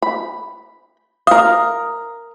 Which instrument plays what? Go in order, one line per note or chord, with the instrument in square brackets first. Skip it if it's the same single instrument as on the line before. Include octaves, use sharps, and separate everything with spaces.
[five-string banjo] B5
[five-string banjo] A#4 F5 [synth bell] D#6